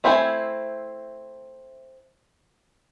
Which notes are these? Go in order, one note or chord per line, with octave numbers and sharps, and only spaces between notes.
A3 C4 E4 C5 G#5